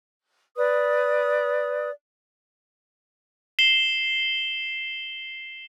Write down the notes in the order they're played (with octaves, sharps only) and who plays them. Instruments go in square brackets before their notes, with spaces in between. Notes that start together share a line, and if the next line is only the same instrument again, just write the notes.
[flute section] B4 D5 D#6
[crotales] C7 E7 G7